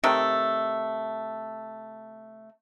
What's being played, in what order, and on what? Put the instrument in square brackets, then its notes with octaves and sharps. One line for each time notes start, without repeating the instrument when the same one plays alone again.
[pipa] C3 D#3 A3